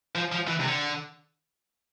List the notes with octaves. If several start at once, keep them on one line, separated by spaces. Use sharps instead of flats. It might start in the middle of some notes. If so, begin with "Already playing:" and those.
F3
F3
E3
C3
D3